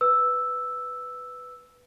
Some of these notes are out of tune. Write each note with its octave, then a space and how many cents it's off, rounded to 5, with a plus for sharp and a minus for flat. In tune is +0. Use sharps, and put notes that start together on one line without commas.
B4 +5 E6 +0